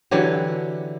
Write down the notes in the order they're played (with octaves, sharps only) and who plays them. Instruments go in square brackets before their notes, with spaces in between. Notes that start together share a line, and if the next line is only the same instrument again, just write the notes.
[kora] D3 E3 F#3 G4